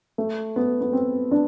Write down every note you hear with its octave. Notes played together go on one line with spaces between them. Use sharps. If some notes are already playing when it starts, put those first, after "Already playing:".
A3
B3
B3
C4
D4